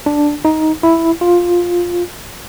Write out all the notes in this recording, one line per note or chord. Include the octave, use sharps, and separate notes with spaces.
D4
D#4
E4
F4